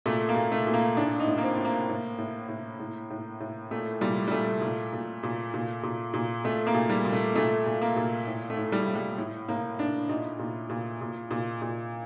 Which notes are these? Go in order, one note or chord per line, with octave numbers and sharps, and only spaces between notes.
A#2 A3
A#3
A#2
A3
A#2
A#3
A2 D4
D#4
A2
A#3
C4
A2
A#3
A2
A2
A2
A2
A2
A2
A#2 A3
A#2 G3
G3
A#2 A3
A#2
A#2
A#2
A#2
A#2
A#2
A#2 A3
A#3
A#2
G3
A#2
A3
A#2 A3
A#2
A#3
A#2
A2
A3
A2
G3
A2
G3
A2
A2 A#3
A2 D4
A#2 D#4
A#2
A#2
A#2
A#2
A#2